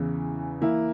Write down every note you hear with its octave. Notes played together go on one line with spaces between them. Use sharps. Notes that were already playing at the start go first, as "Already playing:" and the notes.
Already playing: E2 C#3 E3
E3 A#3 E4